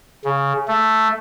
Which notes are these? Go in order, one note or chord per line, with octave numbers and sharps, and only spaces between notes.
C#3
A3